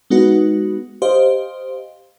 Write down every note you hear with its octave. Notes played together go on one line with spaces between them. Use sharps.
G#3 B3 D#4 F#4 B4
G4 C5 D#5 F5